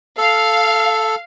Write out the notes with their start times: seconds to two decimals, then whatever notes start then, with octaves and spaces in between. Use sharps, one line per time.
0.18 A4 F5